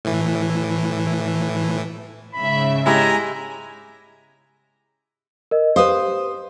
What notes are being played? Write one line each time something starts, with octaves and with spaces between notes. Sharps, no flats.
A2 E3
G#2 C#3 E5 B5
G#3 E4 G4 G#5 A#5
A#4 D#5
G4 B4 C5 F5 D#6